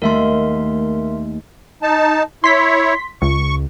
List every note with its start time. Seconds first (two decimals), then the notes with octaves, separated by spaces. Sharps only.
0.02 D#2 A3 A#4 E5 C6
1.82 D#4 A5
2.44 E4 C#5 C6 B6
3.22 C#2 C#6